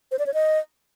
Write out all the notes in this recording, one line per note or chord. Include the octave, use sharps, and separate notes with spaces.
C5
D5
C#5
D#5